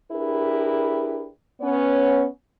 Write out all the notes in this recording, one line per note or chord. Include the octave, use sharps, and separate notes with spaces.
D4 E4 G4 G#4 A#4 B4
B3 C#4 C#5